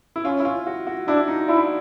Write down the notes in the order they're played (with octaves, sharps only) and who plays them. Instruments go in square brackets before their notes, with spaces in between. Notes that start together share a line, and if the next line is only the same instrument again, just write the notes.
[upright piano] E4
[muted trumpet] C#4 [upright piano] F4
[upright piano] E4
F4
F#4
F#4
[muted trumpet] D4 [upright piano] E4
[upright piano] D#4
[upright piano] D4 [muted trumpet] E4